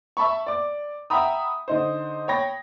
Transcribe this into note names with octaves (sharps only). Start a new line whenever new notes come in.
E5 A5 B5 C#6
D5 D6
E5 F#5 G5 A#5 B5 D#6
D3 D#4 C5
C#5 G5 B5 A#6